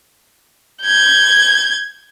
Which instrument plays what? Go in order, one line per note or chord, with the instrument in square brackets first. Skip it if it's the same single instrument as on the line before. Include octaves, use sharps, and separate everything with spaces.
[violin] G6 G#6